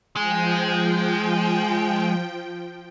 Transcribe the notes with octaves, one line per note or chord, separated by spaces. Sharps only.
F3 G#3 G5